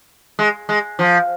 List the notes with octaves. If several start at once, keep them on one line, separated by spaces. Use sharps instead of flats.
G#3
G#3
F3